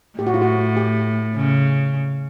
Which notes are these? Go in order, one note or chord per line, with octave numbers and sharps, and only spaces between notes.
A2 G4
F#4
F4
F#4
G4
C#3